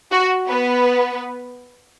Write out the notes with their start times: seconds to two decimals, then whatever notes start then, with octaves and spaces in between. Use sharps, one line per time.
0.12 F#4
0.48 B3 B4